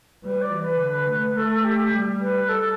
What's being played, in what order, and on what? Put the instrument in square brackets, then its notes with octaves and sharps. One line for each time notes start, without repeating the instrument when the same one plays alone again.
[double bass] G3 [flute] B4
[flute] D5
[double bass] E3
[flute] B4
[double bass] D3
A3
[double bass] A3 [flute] A4
[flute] G4
[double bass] G3
[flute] B4
A4